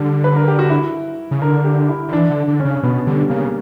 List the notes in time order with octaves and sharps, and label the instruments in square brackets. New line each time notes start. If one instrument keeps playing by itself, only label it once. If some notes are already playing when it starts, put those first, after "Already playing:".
Already playing: [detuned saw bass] D3 [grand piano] G3
[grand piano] B4
A#4
G4
F#4
E4
[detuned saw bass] C#3
[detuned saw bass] D3 [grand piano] A#4
[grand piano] G4
E4
[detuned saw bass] D3
[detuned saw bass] E3 [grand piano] D4
[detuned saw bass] D3
D3
[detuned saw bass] C#3 [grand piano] C#4
[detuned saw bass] B2 [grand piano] B3
[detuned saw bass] D3 [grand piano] G3
[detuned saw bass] C#3 [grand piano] A#3